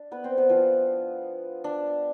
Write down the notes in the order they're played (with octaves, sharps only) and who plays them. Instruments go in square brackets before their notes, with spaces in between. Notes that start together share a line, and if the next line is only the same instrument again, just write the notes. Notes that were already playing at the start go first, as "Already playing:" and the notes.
Already playing: [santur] D4
B3 B4
C4 C5
B3 B4
F3 F4
D4